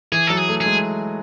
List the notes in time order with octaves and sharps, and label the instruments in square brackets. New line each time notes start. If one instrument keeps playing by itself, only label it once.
[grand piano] E3 [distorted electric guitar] G#4
[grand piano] F#3 [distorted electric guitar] A4
[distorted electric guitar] G#4
[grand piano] A3
[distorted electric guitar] G#4
[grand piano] G#3